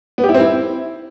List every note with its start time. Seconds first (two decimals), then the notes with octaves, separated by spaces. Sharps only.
0.18 B3
0.23 G4
0.29 E4
0.34 C4
0.40 E4